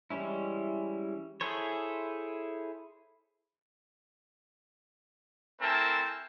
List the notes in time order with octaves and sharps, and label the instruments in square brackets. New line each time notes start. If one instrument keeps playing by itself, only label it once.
[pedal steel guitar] E3 G3 G#3 C#4 E4
E4 G#4 A4 C5 C#5
[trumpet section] A3 C4 E4 A#4 G#5 A5